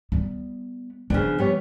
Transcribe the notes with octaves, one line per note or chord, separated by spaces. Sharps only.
G3 B3
C#3 F3 B3 D4
G3 B3 C#5